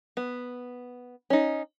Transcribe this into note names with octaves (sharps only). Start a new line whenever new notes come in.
B3
C#4 D#4